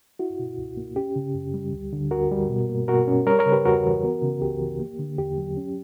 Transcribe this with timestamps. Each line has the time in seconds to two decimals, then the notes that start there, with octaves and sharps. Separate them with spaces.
0.19 E4 F#4
0.39 B2
0.58 C#2
0.77 A#3
0.96 C#4 G4
1.16 C#3
1.34 F#2
1.54 G3
1.73 D2
1.93 D3
2.11 D2 F#4 A#4
2.31 G3
2.50 B2
2.69 A#3
2.88 B2 F#4 A#4
3.08 C#4
3.26 G3 A#4 C#5
3.39 A#4 C#5
3.45 C#3
3.52 G4 B4
3.65 E2 F#4 A#4
3.85 E3
4.04 B3
4.22 C#3
4.42 C#2 G4
4.61 E3
4.80 A#3
4.99 D3
5.18 E2 G4
5.38 F#3
5.57 C#4